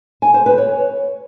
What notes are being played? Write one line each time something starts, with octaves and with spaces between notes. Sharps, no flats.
G#5
C5
B4
C#5